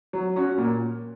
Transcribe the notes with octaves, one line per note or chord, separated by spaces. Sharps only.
F#3
C#4 F#4
A#2